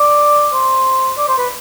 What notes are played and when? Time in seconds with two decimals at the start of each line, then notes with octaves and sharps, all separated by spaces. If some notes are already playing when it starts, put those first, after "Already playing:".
Already playing: D5
0.53 C5
1.18 D5
1.28 C5
1.38 B4